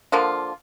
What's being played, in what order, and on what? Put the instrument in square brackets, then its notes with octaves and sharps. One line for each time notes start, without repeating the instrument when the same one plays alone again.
[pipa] D3 F3 A#3 F4